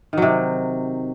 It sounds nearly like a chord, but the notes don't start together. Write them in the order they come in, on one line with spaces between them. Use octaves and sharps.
D#3 F#3 C3